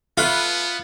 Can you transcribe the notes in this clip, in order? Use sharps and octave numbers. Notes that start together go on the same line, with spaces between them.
A3 B3 F4 B4